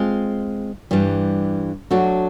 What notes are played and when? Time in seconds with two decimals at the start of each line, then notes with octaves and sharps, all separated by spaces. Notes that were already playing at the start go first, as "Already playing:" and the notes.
Already playing: G#3 C4 F4
0.91 G2 E3 G3
1.91 F#3 A3 D4 F#4